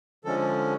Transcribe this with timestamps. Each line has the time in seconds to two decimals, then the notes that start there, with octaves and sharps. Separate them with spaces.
0.24 D3 F3 G#3 C#4 A4